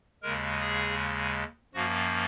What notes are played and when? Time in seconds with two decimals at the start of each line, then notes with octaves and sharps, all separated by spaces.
0.23 D#2 C#3 G#3 A#4
0.61 G#4
1.74 F#2 F3 A#3 F#4